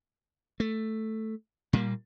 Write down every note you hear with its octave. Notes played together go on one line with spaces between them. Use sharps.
A3
A#2 G3 A#3